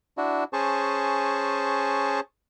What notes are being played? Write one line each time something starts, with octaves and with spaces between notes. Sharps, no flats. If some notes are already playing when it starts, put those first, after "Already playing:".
D4 E4 F#4
C#4 G#4 C5 A5 C#6